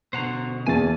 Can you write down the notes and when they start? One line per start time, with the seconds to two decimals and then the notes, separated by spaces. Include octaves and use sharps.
0.13 B2 D3 C5 F#5 A#5
0.67 E2 E3 A#3 G#5 A5